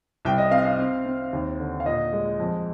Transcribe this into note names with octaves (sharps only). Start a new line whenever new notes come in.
C2 G5
D#5
C4 F5
F5
C4
C4
D#2
D3
F5
A#2 D#5
G#3
F2